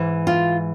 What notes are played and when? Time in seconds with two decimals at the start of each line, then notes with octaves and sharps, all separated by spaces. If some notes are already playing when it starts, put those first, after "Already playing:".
Already playing: G#2 E3
0.27 F4